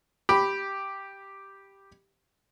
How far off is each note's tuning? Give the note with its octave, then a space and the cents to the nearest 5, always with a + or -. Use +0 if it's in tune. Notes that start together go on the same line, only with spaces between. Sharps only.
G4 +0 B5 +0